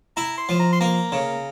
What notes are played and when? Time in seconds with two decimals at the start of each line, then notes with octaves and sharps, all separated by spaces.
0.17 E4 A#5
0.38 C6
0.49 F3
0.59 A#5
0.72 C6
0.80 A#3 A#5
1.12 C#3